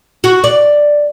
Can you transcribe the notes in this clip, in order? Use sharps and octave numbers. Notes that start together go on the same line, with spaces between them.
F#4
D5